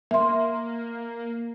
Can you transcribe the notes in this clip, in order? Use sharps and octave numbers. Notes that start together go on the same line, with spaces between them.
A#3 E5 C6